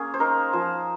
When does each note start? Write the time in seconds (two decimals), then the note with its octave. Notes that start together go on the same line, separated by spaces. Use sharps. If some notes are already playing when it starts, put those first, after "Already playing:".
Already playing: A#3 C#4 G#4
0.14 C5
0.20 D#4 A#4
0.53 F3 C5